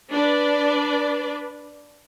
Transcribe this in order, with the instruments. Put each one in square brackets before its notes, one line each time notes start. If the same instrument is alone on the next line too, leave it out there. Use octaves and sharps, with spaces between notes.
[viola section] D4 B4 D5